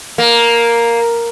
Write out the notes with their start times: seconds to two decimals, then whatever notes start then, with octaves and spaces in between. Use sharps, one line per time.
0.18 A#3